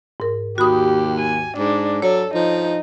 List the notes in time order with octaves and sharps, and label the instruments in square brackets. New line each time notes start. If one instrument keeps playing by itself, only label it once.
[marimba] G#2 A#4
[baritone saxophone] D#2 [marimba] F#4 B5 D#6 [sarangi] G4
[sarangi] G#5
[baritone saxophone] G#2 [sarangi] D4
[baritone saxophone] F#3 [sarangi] A4 [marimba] C#5
[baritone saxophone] F3 [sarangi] D#4